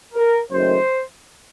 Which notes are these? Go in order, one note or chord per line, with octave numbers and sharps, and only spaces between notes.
A#4
F#1 F#2 D#3 A3 C5